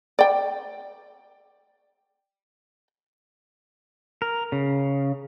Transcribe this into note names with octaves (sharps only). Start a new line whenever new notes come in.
D5 G5
A#4
C#3